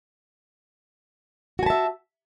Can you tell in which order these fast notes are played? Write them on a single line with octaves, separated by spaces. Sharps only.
F#4 G#5 A5 E5